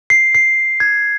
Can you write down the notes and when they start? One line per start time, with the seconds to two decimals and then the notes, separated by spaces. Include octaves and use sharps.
0.10 C7
0.35 C7
0.80 G#6